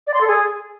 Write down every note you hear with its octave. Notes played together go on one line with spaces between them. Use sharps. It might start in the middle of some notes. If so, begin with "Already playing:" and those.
D5
C6
A4
G#4